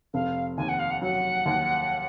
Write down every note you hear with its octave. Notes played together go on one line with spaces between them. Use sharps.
F1 F5
D#2 G#5
F#5
F5
F#5
F#3 F#5
D#2